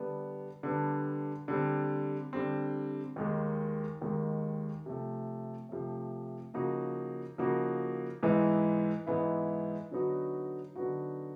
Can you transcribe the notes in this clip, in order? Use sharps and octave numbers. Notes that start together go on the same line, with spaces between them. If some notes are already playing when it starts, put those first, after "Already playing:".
Already playing: D3 G3 B3 D4
D3 G3 B3 D4
D3 G3 C4
D3 G3 C4
D#2 D#3 G#3
D#2 D#3 G#3
C3 F3 A3
C3 F3 A3
C#3 F3 A#3 D#4 F#4
C#3 F3 A#3 D#4 F#4
G#2 E3 G#3 B3 E4
G#2 E3 G#3 B3 E4
D3 F#3 B3 D#4 F#4
D3 F#3 B3 D#4 F#4